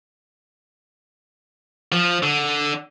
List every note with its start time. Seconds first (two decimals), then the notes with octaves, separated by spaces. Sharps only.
1.92 F3
2.23 D3